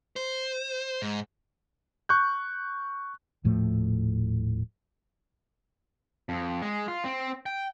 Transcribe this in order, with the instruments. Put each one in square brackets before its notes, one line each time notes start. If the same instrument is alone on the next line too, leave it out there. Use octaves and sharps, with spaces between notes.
[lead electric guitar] C5
G#2
[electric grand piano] C#6 F#6 G6
[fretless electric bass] D#1 A2 F3 A3
[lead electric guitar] F2
G#3
F4
C4
G5